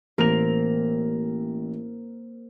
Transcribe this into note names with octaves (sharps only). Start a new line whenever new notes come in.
A1 A#3 C4 A#4 F7